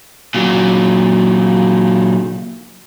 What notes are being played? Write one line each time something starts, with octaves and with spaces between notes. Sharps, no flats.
A#2 F#3